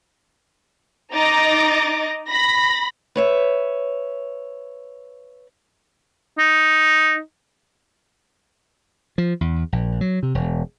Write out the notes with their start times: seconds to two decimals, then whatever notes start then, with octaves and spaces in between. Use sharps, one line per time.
1.13 D#4 D#5 A#5 D6 A6 A#6
2.29 B5 A#6
3.16 B4 C#5 E5
6.38 D#4
9.18 F3
9.41 E2
9.72 A#1
10.01 F#3
10.23 C3
10.35 E1